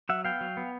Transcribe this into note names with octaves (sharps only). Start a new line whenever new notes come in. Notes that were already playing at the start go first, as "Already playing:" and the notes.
F#3 E5 F#5
B3 F5 G5
F#3
B3